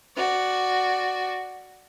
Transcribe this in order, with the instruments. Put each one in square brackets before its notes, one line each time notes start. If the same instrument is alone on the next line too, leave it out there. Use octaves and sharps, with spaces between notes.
[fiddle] F#4 D5